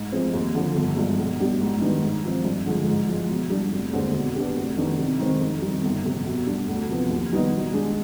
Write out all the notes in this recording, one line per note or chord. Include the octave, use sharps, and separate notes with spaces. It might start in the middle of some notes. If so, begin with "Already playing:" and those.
Already playing: G#2
F3 G#3 C4
D#2
D3 F3
G1
G2 F3 G#3
B1
B2 G3 D4 G4
G#2
D#3 G3 B3 D4
G#2
F3 C4
G2
D3 F3 G#3
G#2
F3 G#3
B2
G3 D4
F1
D#2 D3 G#3 C4
B2
B3 D4 G4
F1
F2 D#3 B3 D4
C3
D#3 G#3 C4
F2
D#3 G3
G1
F2 C3
B2
G3 D4
D2
C3 F3 B3
D#2
D#3 G3 B3 D#4
B2
G#3 D4 G#4